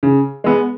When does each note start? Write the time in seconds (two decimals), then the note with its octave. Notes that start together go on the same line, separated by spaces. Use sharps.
0.03 C#3
0.44 G#3 B3